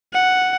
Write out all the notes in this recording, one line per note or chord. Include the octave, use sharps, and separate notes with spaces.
F#5